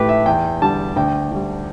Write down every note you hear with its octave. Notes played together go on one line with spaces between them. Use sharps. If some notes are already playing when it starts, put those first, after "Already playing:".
Already playing: A1 A2 A3 G4 B4
E5
E2 G5
D3 G3 A5
D2 G5
D3 G3